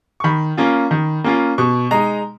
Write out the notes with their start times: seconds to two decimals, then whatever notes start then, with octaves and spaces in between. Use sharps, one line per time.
0.20 C#6
0.24 D#3 B5
0.57 A#3 C#4 F4
0.91 D#3
1.24 A#3 C#4 F4
1.58 B2 C#6
1.91 G#3 D#4 A#5